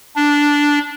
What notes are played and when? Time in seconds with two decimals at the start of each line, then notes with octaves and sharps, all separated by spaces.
0.16 D4